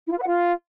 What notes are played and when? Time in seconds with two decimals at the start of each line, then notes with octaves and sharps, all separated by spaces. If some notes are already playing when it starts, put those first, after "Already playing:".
0.06 E4
0.11 F4
0.16 B4
0.21 F#5
0.27 F4